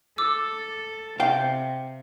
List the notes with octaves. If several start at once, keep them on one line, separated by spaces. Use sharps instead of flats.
A4 D6 E6
C3 F5 G5